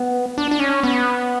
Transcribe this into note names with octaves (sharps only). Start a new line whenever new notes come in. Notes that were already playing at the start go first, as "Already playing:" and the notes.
Already playing: B3
D4
D4
C#4
B3